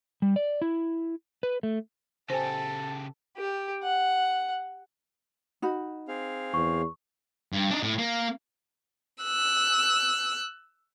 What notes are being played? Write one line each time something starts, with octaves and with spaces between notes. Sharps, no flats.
G3
D5
E4
B4
A3
C#3 G4 A4 C5 G#5
G4
F#5
D#4 F#4 B5
C4 G#4 F5
E2 C#6
G2
D4 D#4
A2
A#3
E6 F#6